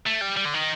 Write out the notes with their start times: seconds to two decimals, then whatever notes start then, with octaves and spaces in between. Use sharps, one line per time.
0.07 A3
0.22 G3
0.37 G3
0.45 D3
0.54 D#3